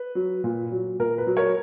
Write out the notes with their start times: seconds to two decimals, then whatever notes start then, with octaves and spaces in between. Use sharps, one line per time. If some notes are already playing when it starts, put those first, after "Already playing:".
Already playing: B4
0.15 F#3
0.44 A#2
0.71 F#3
0.99 A#2 A#4
1.18 B4
1.27 F#3
1.37 A#4 C#5